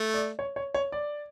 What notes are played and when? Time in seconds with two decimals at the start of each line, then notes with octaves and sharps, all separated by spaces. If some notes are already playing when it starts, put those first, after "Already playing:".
Already playing: A3
0.14 D5
0.39 C#5
0.56 C#5
0.74 C#5
0.92 D5